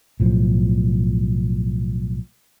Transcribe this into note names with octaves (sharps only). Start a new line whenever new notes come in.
B1 A2 F3